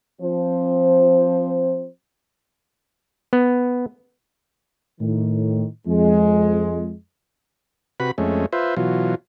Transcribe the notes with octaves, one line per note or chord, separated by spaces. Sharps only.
F3 C4 C5
B3
A2 D#3
F2 G#3
C3 F#4 B4 B5
F2 G#3 A3 C#4
F4 B4 C5 E5
B2 E3 F#3 F4